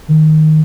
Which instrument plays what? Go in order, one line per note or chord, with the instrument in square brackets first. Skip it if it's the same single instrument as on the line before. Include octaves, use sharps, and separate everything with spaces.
[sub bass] D#3